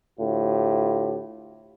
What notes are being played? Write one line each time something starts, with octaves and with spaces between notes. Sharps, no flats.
D2 A2 F4 G4